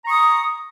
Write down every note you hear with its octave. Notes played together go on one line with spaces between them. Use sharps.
A#5 C#6 D#6